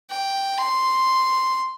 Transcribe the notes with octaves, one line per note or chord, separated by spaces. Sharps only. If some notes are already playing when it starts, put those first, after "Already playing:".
G5
C6